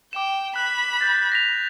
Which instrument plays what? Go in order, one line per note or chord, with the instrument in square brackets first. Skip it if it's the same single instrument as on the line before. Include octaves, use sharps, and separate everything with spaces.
[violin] G5 [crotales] D6 E7
[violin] B5 [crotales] F#6
[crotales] F#6 G6 A6
A#6 B6 F7